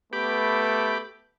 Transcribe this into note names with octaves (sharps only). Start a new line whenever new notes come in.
A3 B3 G4 B5 D6